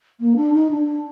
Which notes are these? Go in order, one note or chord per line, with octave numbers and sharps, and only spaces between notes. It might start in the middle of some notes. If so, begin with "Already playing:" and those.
A#3
D4
D#4
D4